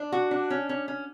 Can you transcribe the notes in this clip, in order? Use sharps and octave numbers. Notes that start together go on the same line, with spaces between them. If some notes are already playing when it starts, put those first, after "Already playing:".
Already playing: D4
F#4
D4
C#4
C#4
C#4